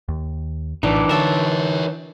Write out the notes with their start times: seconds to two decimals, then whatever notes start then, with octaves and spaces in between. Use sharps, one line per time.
0.08 D#2
0.83 A#1 A2 E3 D4 D#4
1.09 D3 A#4 C#5 E5 A5 C6